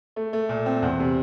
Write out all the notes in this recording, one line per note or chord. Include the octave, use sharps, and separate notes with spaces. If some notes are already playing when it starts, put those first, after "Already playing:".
A3
A3
A#2
C4
E2
C3